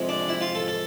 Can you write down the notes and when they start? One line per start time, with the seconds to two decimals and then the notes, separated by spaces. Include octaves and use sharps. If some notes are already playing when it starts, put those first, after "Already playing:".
Already playing: F2 C3 F3 G#3
0.09 D4
0.28 E4
0.41 F4
0.55 A4
0.68 A4